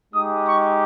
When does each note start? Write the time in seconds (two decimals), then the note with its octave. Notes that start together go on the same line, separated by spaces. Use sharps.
0.13 G#3 D#4 G4 D#6
0.46 C#6